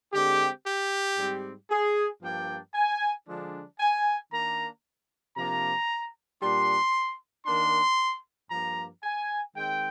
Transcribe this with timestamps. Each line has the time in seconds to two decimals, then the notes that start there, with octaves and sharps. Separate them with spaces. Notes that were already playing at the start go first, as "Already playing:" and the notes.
0.12 D3 G#3 C4 G4
0.65 G4
1.17 G#2 G3 C4
1.70 G#4
2.22 G2 F3 A#3 D4 G5
2.74 G#5
3.27 D3 F3 G#3 D4
3.80 G#5
4.31 D#3 A#3 D4 A#5
5.36 C3 F3 A#3 D4 A#5
6.41 A#2 G3 D4 C6
7.46 D#3 A#3 D4 C6
8.50 G2 F3 A#3 A#5
9.03 G#5
9.55 D#3 G#3 C4 G5